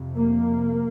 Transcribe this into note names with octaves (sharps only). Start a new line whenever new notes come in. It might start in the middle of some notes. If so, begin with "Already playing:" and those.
Already playing: F2 C3
A#3